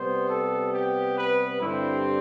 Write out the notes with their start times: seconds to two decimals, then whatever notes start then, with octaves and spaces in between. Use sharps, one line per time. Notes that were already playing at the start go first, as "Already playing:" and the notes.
Already playing: C3 G3 B3 C5
0.30 A4
0.73 G4
1.17 B4
1.61 G2 D3 G3 C4 E4